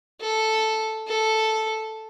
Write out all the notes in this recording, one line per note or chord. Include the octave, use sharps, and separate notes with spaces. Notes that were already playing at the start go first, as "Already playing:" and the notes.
A4
A4